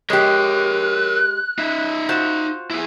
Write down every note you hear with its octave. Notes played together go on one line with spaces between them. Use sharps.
G#3 G4 A#4 C#5 F#6
D#4 E5
F4 F#4 C5
E4 G#4